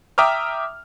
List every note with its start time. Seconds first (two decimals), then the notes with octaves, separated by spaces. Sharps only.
0.18 E5 G5 A#5 D6 D#6 F6